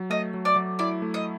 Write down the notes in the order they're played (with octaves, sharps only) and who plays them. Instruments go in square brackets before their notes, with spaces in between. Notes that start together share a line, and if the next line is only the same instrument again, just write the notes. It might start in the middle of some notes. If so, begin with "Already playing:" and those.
Already playing: [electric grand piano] F#3
[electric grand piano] A3 [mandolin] D#5
[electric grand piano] F#3
[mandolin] D5
[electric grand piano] F#3
[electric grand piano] E4 [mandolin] D5
[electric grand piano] A3
[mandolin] D#5